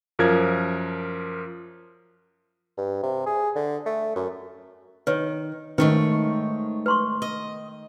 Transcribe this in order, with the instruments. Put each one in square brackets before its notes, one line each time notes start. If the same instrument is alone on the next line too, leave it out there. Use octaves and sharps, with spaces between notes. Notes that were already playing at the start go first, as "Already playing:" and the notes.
[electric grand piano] F#2 F3 A#4 G#6
[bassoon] G2
C3
G#4
D3
A3
F#2
[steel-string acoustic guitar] D#3 [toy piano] B4 C#5
[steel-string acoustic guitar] G#2 A3 C#5 [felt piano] D#3 [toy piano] B4
[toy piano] B4 C6 C#6
[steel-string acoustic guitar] D#5